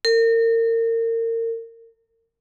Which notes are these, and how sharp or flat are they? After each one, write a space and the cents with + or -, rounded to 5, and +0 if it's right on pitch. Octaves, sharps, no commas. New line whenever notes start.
A#4 -35